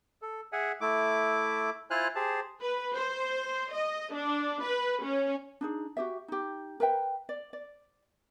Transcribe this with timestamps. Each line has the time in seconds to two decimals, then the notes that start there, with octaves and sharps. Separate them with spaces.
0.22 A4
0.52 G#4 E5 F#5 G#5
0.81 A3 E4 D6
1.91 E4 F4 C5 G#5 F6 F#6
2.15 G4 G#4 C5 A5
2.61 B4
2.94 C5
3.72 D#5
4.13 D4
4.63 B4
5.04 C#4
5.61 D4 D#4 G#4
5.97 F#4 G4 E5
6.28 D#4 G4
6.80 A#4 B4 E5 G5
7.29 D5
7.53 D5